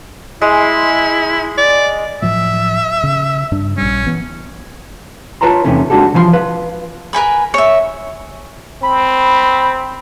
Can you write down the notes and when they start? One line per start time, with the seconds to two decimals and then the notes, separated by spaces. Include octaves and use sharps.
0.42 G#3 E4
1.58 D5
2.22 A2 F3 F#3 E5
3.03 C#3
3.51 G2 D4
3.78 A#1 G3 C#4
4.06 E3 B3
5.41 F4 B4 C#5 A5 A#5 C6
5.65 E2 C3 D#3 A3 C#4
5.90 G#3 D4 F#4 G4 A4
6.14 C2 E3 F3 G4 C6
6.33 B4 F5
7.13 A#4 B4 G#5 B5
7.54 C#5 E5
8.83 C4 B5